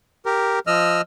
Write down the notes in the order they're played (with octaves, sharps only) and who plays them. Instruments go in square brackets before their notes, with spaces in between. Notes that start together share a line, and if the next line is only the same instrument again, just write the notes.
[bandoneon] G4 A#4
F3 D#5 E6 F6